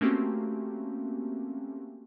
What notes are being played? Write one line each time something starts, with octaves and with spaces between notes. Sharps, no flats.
A3 A#3 C4 C#4 F#4 G4